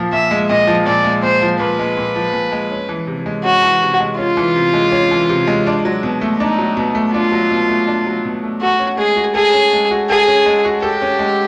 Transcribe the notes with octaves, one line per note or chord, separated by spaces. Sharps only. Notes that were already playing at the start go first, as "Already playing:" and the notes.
Already playing: A#2 F3
A#2 E5
G#3
A#2 D#5
F3
A#2 D5
G#3
A#2 C5
F3
A#2 B4
G#3
A#2
F3
A#2
G#3
C#4
E3
C3
G#3
C#4 F#4
E3
C3
G#3
C#4 F4
E3
C3
G#3
C#4
E3
C3
G#3
D4
F#3
B2
A3
D4 D#4
F#3
B2
A3
D4 F4
F#3
B2
A3
D4
F#3
B2
A3
F#4 A4
C#4
G#3 G#4
F#4
G#4 A4
C#4
G#3
F#4
G#4 A4
C#4
G#3
F#4
G4 A4
C#4
G#3